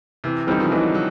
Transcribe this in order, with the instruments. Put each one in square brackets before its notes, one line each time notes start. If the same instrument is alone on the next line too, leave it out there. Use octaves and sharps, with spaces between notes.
[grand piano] C3 [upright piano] E3
[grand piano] D3 E3 [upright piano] G3 C4 D#4
[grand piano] D#3 F3
[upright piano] E3 [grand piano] F#3 G#3
[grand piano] F#3